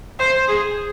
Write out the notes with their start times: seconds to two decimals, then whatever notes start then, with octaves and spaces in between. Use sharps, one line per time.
0.19 C5
0.48 G#4